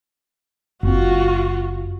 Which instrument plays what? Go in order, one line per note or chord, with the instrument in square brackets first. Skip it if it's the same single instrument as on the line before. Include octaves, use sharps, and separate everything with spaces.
[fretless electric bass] F#1 C4 [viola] F4 F#4